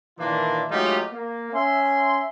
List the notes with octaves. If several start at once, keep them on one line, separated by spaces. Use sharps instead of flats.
A#2 D#3 E3 A#3 D4 F4
F#3 G#3 A3 D#4 F4 G4
A#3
C#4 E5 G#5 C6